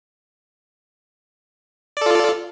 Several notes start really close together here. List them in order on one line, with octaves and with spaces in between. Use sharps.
D5 A4 F4